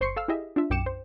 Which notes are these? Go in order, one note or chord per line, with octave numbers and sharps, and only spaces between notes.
G1 C5 C6 C#6 C7 C#7
A4 F5 E6 F6
E4 G4 G#4 D#5 E5
D4 F4 E5
B1 F#2 G5 D6 C#7 E7
C5